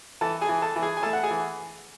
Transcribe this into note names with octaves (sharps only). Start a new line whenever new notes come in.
E3 A4 A5
G#4 G#5
E3
A4 A5
E3
G#4 G#5
G#5
A3 A4 A5
F#5
G#4 G#5
E3